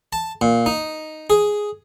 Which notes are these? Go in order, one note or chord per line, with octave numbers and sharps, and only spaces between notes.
A5
A#2
D#4
G#4